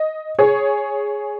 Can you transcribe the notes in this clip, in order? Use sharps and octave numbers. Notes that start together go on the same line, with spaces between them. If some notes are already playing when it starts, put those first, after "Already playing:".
Already playing: D#5
G#4 C#5